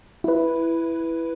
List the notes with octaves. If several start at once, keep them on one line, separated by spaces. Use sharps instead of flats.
E4 B4